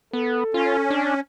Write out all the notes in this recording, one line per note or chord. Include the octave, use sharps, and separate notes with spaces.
B3 A4
C#4 F4
D4